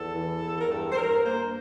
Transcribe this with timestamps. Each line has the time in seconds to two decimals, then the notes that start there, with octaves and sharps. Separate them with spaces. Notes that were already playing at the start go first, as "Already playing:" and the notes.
Already playing: E2 A4
0.14 E3
0.42 E2
0.61 A#4
0.69 G2 A4
0.92 C5
0.97 G2 A#4
1.24 A#3 C5